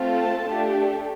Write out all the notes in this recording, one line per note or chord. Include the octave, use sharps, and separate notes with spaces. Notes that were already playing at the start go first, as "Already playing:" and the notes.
Already playing: A3 C4 F4 A4
A5
A3 D4 G4